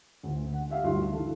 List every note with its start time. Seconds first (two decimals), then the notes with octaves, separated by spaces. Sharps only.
0.23 D2
0.53 F#5
0.70 G4 E5 F5
0.83 D2 G2 D#4 F#4 C6
1.13 E3 A4